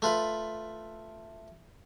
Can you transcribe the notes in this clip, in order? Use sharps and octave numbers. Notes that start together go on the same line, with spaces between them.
A3 F4 B4